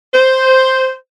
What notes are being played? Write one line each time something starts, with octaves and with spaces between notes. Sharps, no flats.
C5